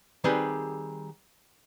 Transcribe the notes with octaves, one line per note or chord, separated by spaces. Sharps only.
D#3 G3 C4 G4 G#4 B4